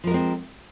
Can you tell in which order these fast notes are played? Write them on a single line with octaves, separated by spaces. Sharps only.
F3 A#4 G#3 C4